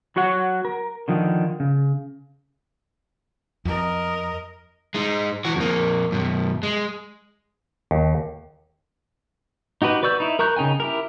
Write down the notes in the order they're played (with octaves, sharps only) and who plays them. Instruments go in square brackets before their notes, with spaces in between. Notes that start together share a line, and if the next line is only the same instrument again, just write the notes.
[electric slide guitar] F#3 F#4 C#5 F#5
A#4
D3 D#3 F3
C#3
[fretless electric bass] F2 [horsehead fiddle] A#4 D#5
[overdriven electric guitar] G#3 D#4
E3 F#4
F2 A#3
F#2 B2
G#3
[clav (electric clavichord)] D#2
[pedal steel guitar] D#4 F#4 G4 B4
B4 D5 C#6 E6 G6
D#4 E4
A#4 A#5 C#6 F#6 G6
C#3 D#4 G5 G#5
E4 G4 A#4